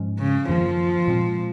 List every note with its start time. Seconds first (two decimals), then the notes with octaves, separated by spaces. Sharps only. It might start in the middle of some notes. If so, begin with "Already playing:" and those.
Already playing: G#2 F3 G#3 C#4
0.19 C#3
0.49 F#2 D#3 F3 A#3
1.08 A#2 G#3 C4